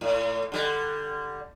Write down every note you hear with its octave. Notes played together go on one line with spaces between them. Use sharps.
A2
D3 G3